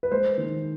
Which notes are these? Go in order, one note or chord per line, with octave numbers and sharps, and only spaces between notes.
B4
G#3 C5
D#3